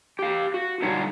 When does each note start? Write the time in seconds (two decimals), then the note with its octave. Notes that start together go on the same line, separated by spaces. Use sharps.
0.19 G4 F5
0.54 F#4
0.82 D3 G3 D#4 F4 C#5 F#5